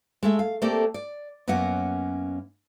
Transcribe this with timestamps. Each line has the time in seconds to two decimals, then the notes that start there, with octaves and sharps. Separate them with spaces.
0.23 G#3 A3 E5
0.39 F5
0.62 A3 A#3 C4 G4 A4 D5
0.94 D5
1.48 F#2 A#3 B3 C#4 F#5